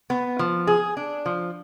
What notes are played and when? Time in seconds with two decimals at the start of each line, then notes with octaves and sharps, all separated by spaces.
0.10 B3
0.39 F3
0.67 G#4
0.97 D4
1.26 F3